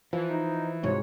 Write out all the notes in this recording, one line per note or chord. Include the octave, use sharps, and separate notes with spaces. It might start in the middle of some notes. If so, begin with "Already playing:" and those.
E3 F3
D#4
C2 F2 G#2 F#4 C#5